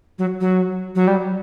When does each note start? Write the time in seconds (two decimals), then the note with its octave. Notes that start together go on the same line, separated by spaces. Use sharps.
0.19 F#3
0.41 F#3
0.95 F#3
1.08 G3